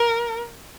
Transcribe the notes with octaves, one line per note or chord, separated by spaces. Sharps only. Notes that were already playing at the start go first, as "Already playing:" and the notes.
Already playing: A#4